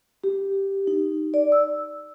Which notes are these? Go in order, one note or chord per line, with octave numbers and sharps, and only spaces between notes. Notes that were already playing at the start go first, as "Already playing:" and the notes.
G4
D#4
D5
E6